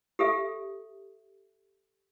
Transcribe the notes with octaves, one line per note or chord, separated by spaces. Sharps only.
G4 A4 E5